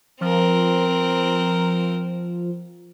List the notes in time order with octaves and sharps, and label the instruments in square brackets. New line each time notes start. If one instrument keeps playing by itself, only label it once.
[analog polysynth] F3 [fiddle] C4 A#4